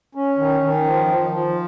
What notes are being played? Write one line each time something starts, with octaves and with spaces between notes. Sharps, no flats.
C#4
D#3
D#3
F3
F3
F3